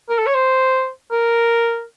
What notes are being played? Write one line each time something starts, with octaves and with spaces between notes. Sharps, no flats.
A#4
A4
C#5
C5
A#4